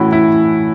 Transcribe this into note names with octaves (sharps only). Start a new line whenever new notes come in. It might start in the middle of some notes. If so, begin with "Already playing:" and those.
Already playing: A2 E3 A3 C#4 E4 F#4
E4